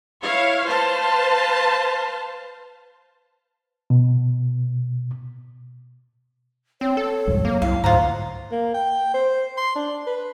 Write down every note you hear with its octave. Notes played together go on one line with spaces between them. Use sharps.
E4 C#5 F5
B4 C5 F5 A5
B2
C4 C#5
A4
C2 F2 G#2
F#2 A#3
C2 E4 F5
D2 G#2 F4 C5 F#5 A#5
A#3
G5
C5
C6
D4
B4